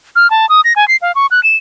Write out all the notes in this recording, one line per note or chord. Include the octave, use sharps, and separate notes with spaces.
F6
A5
D#6
A#6
G#5
C7
F5
C#6
F#6
E7